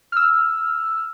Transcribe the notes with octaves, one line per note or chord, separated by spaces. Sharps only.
E6 F6